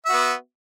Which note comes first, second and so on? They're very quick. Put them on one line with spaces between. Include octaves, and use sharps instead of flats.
E5 F#4 B3